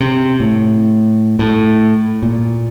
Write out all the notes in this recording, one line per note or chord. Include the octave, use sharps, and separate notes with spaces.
C3
A2
A2
A#2